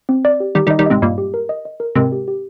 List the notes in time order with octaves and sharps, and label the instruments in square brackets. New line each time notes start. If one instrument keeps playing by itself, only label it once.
[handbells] C4
D5
G4
[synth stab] D#3 G3 [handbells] G4
[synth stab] D#3 G3
[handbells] D#5
[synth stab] D#3 G3
[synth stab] G#2 C3 [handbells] D#5
[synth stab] G2 A#2 [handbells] D#5
[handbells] G4
A#4
D#5
D#5
A#4
[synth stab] G#2 C3 [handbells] A#4
[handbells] G4
G4